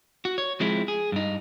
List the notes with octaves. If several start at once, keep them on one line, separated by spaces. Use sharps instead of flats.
F#4
C#5
F3 G#3 C4 E4
G#4
G2 D#4